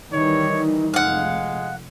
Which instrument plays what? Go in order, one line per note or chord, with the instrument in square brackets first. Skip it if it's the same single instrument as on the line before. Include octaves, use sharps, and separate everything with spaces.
[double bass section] D#3 E3 G3 [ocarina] D#4 [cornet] C#5
[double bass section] F1 [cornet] G#3 [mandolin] F5 F#5